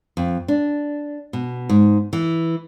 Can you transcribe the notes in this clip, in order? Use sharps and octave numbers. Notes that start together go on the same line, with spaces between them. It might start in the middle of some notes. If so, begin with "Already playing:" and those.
F2
D4
B2
G#2
E3